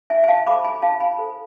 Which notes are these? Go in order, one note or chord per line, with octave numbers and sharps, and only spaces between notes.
E4 E5 G#5
G#5
F5 A5
A4 C5 B5 D6
G#5 B5
E4 F5 A5
G#5 B5
A4 C5